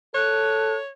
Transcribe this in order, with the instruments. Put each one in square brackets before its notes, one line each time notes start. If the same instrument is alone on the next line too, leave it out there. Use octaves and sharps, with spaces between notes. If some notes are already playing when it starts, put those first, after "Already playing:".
[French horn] A4 [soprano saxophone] C#5 [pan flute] F#6